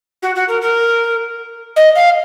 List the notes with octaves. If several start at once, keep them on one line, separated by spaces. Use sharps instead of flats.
F#4
F#4
A#4
A#4
D#5
F5